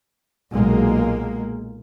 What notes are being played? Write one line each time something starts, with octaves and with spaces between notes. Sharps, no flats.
B1 A#2 G#3 A#3